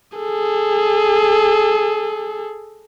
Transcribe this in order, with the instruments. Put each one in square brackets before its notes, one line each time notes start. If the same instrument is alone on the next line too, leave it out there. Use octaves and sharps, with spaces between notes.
[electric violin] G#4 A4